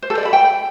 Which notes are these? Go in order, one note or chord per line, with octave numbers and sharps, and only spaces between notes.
C5
A4
D5
B5
G5